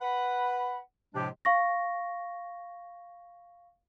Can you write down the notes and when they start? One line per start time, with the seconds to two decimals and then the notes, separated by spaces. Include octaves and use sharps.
0.02 B4 F#5 B5
1.14 A2 C3 F3 G#3 D4 G4
1.45 F5 C#6 A#6